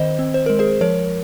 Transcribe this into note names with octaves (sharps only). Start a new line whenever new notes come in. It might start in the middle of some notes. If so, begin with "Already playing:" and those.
Already playing: D#3 C4 C5 D#5
C4
C5
G#3 A#4
G#4 C5
F3 A#4 C#5